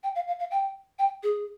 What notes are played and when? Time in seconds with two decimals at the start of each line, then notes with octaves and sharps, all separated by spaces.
0.03 G5
0.16 F5
0.27 F5
0.39 F5
0.51 G5
0.99 G5
1.23 G#4